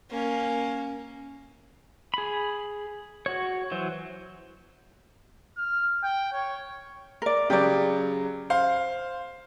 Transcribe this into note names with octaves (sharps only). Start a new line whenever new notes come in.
A#3 C#4
G#4 B5
F#4 C#5
E3 F#3 C5
F6
G5
C#5
A#4 D5
C#3 F#3 G4 D5
C5 F5